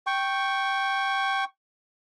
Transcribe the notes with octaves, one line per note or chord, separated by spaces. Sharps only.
G5 C#6